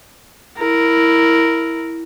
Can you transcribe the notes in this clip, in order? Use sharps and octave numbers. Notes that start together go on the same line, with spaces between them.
E4 A#4